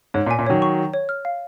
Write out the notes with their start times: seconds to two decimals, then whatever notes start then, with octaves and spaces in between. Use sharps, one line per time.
0.14 G#2 C#5
0.26 A#2
0.31 G#5
0.39 A#2
0.46 D#3 F#3 C#5
0.62 C#6
0.78 C#5
0.93 C#5
1.09 F6
1.25 F5